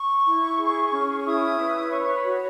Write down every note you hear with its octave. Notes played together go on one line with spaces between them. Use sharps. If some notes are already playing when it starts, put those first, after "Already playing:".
Already playing: C#6
E4
G#4
C#4
E4 D#6
B4
C#5 C#6
C#6
B5
F#4